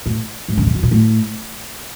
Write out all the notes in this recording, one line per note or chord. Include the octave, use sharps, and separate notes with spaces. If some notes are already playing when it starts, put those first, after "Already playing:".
A2
G#2
C#3
C3
B2
A#2
A2